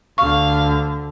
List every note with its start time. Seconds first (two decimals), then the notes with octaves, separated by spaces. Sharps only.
0.18 D2 D3 F5 C#6